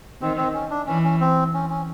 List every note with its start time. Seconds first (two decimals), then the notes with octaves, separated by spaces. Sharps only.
0.21 D#3 C4
0.37 C4
0.54 C#4
0.70 D4
0.87 E3 C#4
1.04 C#4
1.21 C4
1.54 C#4
1.70 C#4